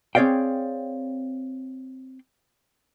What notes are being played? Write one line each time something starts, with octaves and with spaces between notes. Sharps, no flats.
C4 G#4 C#5 D5 F5 G5